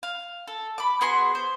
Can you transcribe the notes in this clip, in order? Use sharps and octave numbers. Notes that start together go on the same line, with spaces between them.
F5
A4
B5 D6
B3 F#4 G#4 C6
C5